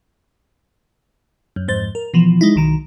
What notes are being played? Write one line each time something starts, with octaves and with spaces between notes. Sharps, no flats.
F#2
F2 G#2 C5 A6
A#4
B2 E3 F3
G#3 D#4 E4
B1 D#3 A#5